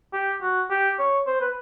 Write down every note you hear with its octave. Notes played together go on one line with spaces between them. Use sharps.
G4
F#4
G4
C#5
C5
B4